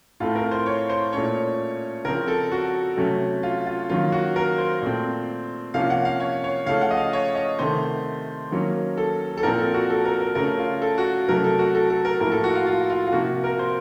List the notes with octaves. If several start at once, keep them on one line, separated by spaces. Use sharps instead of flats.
A2 A3 C4 F4
A#4
C5
C#5
C5
A#2 A3 C#4 C#5
C#3 F3 C4 A#4
A4
F#4
C3 F#3 A3 C#4
F4
F4
D#3 F#3 A#3 C#4 F4
F#4
A#4
C5
A#2 A3 C4
C3 F3 A#3 C#4 F5
F#5
F5
C#5
C#5
C#3 F3 A3 C#4 F5
F#5
D#5
F5
C#5
D#5
C3 D#3 A3 C5
D#3 F#3 A#3 C#4
A4
A4
A#2 F3 C4 A#4
A4
F#4
A4
A#4
A#4
C#3 A3 C#4 A#4
F4
A4
F#4
C3 F#3 A3 A#4
A4
F#4
A4
A4
A#4
A2 F3 A#3 A#4
A4
F#4
F4
F4
F4
F4
C3 F3 A#3 F#4
A#4
C5